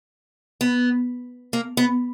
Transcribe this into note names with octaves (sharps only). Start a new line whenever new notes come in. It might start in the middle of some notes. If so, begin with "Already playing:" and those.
B3
A#3
B3